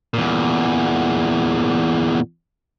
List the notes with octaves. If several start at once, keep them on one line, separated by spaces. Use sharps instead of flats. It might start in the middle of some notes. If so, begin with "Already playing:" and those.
E2 A#2